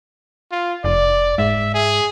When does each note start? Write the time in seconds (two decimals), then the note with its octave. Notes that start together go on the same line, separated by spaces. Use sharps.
0.52 F4
0.84 F1 D5
1.38 G#2 E5
1.74 G#4